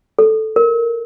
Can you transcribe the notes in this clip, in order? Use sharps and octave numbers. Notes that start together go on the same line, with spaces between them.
A4
A#4